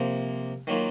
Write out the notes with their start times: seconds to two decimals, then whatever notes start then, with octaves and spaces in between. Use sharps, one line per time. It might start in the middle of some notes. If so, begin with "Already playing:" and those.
Already playing: C3 F3 A#3
0.67 D#3 F#3 A#3 F4